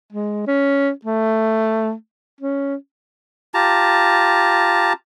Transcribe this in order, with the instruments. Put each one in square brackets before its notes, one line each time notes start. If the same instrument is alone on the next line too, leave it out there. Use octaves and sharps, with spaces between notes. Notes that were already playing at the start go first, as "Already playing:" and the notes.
[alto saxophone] G#3
C#4
A3
C#4
[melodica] F4 G4 A5 A#5